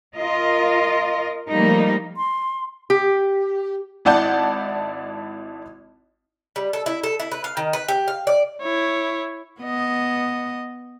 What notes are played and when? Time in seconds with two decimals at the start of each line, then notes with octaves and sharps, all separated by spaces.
0.15 F4 A#4 D#5
1.51 F3 G3 A3 A#3 D#4
2.17 C6
2.90 G4
4.05 G#1 E4 D5 F#5 A5 G6
6.56 G3
6.73 A4
6.86 E4
7.03 A4
7.20 E4
7.32 B4
7.44 F5
7.57 D#3
7.73 B4
7.88 G4
8.08 F5
8.27 D5
8.62 E4 C#5
9.61 B3 D#5